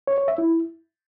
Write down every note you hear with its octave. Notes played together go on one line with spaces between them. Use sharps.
C#5
C#5
E5
E4